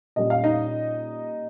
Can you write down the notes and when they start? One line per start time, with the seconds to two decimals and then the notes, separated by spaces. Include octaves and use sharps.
0.16 A#2 G3 C#4 D#5
0.30 F5
0.44 D#4 D#5